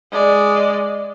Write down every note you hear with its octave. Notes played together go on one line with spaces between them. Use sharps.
G#3 D5